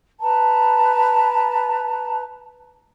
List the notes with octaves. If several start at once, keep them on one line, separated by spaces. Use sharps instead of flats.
B4 A5 A#5